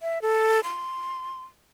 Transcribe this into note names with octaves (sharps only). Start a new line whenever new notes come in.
E5
A4
C6